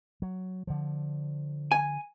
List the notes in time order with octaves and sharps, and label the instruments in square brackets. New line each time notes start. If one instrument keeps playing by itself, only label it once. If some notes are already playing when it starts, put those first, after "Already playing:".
[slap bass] F#3
D3 F3
[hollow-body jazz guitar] G#5